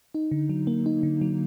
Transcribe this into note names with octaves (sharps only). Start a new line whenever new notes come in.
D#4
D3
F#3
A#3
D#4
D3
F#3